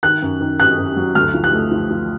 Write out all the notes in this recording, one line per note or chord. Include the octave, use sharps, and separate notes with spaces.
D#3 F#6
F#2
D#3
F#2 F#6
F#2
F#3
D2 F6
F3
F#6
A3
F3
F3